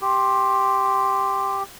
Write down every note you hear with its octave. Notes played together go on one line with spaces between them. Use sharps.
G4 C6